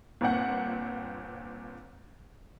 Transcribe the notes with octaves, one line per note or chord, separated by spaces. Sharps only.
G1 A#2 C4 F#5